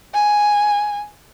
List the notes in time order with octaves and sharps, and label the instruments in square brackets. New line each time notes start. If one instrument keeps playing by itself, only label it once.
[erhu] G#5